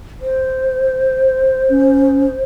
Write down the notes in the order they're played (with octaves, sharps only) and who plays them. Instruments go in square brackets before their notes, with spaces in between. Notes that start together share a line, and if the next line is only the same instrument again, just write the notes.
[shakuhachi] C5
[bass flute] C#4